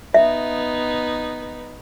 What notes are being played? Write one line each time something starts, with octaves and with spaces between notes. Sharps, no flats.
B3 D#4 E5